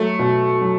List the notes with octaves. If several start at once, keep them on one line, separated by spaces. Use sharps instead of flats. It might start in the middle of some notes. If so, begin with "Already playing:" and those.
Already playing: F#3 A3
B2
F#3